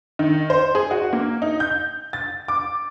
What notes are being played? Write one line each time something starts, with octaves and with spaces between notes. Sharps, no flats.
D#3
C5
G#4
F#4
A#3
D#4
G6
A6
D6